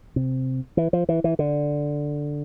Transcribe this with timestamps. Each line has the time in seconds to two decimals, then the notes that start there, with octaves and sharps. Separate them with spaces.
0.16 C3
0.77 E3
0.93 F3
1.09 E3
1.24 E3
1.39 D3